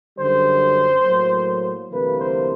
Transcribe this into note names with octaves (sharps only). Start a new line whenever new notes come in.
F#2 D3 G3 C5
A2 F#3 A#3
D2 C3 E3 G3 A#3 B4
C5